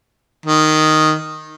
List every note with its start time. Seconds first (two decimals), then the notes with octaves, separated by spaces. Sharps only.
0.46 D#3